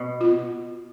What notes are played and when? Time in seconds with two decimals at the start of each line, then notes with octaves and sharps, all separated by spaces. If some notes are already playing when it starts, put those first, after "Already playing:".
Already playing: B2
0.21 F4